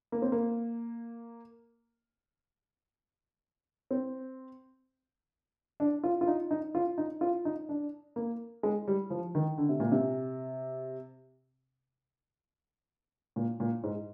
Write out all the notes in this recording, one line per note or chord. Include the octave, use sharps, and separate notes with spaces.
A#3
C4
A#3
C4
D4
F4
F4
D#4
D#4
F4
D#4
F4
D#4
D4
A#3
G#3
G3
F3
D#3
D3
C3
A#2
C3
A#2
A#2
G#2